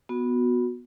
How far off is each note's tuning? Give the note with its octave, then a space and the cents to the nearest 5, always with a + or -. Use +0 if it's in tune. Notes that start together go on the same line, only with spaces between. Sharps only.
B3 +0 F#4 -20